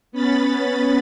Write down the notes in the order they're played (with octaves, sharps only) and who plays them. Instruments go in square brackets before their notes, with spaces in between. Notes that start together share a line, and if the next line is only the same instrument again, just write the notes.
[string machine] B3 C#4 B5 A6